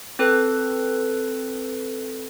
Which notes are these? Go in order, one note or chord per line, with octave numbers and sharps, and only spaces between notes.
C4 A4 B4